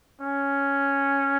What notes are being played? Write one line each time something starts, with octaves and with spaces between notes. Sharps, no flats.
C#4